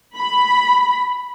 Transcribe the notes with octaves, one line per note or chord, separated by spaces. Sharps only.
B5